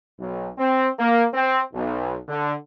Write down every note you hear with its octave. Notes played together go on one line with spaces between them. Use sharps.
B1
C4
A#3
C4
B1
D3